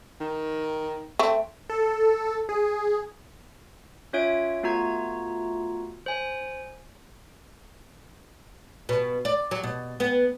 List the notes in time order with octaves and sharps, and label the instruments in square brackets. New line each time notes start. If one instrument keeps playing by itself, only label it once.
[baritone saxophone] D#3
[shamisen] A3 C4
[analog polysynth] A4
G#4
[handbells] C#4 F4 C#5 E5 G#6 D7
A3 B3 F4 F#4 A#5 G#6
C5 G#5
[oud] B2
D5
F#3
B2
B3